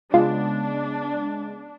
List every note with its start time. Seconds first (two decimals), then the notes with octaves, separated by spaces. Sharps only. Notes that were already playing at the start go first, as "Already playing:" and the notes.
0.14 C#3 G#3 B3 D4 F4